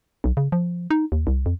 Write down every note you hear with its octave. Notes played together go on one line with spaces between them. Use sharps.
B1
C#3
F3
D#4
D#2
C2
F2